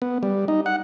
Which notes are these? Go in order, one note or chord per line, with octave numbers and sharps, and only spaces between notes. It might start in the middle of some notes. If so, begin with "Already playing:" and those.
B3
G3
D#4
F#5